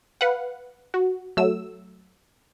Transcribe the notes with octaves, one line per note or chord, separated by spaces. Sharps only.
B4 F5 F#5
F#4
F#3 A3 E6